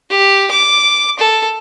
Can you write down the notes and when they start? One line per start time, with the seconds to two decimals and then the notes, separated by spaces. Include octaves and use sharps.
0.10 G4
0.51 D6
1.19 A4